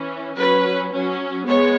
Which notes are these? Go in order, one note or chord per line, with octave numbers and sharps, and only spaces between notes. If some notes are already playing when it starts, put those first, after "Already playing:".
Already playing: E3 C#4
F#3 C#4 B4
F#3 C#4
G#3 B3 C#5